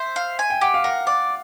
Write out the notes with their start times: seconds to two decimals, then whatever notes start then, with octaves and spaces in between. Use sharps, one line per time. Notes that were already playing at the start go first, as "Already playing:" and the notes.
Already playing: C5 E5
0.16 F5
0.39 G#5
0.50 G5
0.61 G4 F#5
0.74 F5
0.84 A#4 F#5
1.07 D5 F#5